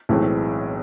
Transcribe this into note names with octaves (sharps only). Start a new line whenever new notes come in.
B1 A2 E3 G#3 C4